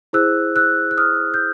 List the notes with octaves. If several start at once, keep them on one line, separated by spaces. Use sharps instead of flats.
E4 G#4 C5 E6 F#6
E6 F#6
F#6
D#6 F6
G6